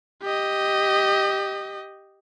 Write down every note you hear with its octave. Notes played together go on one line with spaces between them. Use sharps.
G4 D#5